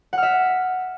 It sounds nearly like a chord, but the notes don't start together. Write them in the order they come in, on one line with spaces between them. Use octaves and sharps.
F#5 F6 E5